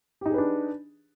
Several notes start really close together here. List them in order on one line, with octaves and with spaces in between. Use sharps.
G4 D#4 G#4 B4 D4